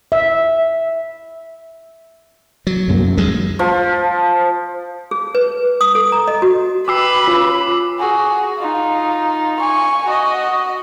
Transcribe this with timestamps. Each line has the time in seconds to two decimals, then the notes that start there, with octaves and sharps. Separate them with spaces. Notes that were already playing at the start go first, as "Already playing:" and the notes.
0.12 E5
2.67 F#3
2.88 C2 F#2 A#3
3.04 F#2
3.17 D2 G#3
3.59 F3
5.11 G#4
5.35 B4
5.81 D#6
5.95 A4
6.12 A#5
6.28 D#5
6.42 F#4
6.88 G4 B4 D6 E6 C7
7.28 C#4 F4
7.99 F#4 G#4
8.58 D#4 F4
9.59 G#5 C#6
10.05 F#4 D#5